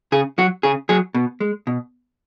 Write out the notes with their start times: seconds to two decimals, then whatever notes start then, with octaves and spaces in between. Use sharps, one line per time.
0.12 C#3 G#4
0.38 F#3 F#4
0.63 C#3 G#4
0.89 F#3 G#4
1.14 B2
1.40 G#3
1.67 B2